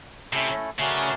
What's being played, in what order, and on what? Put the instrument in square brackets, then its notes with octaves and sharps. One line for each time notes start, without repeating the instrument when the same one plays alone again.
[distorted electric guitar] C3 [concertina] A3 C#4 E4 A4
[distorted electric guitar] C#3 [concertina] A3 C#4 F#4 A#4 D5